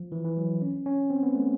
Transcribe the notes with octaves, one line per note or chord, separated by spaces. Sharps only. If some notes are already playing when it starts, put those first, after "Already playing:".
Already playing: F3
E3
E3
F#3
C#4
C#4
C4
B3
A3